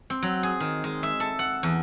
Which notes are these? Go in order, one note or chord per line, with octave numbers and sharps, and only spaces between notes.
C4
F#3
G#4
D#3
G#3
E5
A4
F#5
E2